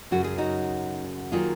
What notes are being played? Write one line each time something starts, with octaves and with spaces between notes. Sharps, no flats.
F#2 C#3 F#3 F#4
G#4
D#4 F#4
D#3 F#3 A#3 F4 G#4